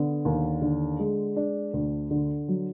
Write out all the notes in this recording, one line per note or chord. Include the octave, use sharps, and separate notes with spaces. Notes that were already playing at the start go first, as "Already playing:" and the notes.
Already playing: D3 B3
D#2
D3
G#3
D4
D2
D3
F#3